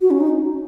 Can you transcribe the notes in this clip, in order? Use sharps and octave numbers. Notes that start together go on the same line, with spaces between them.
F#4
C#4
D#4